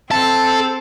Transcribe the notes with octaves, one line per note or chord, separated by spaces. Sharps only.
C4 A4